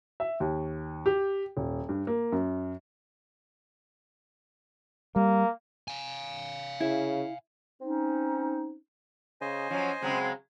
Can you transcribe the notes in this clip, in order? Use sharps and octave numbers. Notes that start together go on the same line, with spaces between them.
E5
D#2
G4
D#1
G2
A#3
F#2
G3 A#3
F5 G#5
C#3 E4
C4 C#4 D#4
C#3 C5 D#5 G#5
F3 F#3 C#4
C#3 F#3 G#3 C4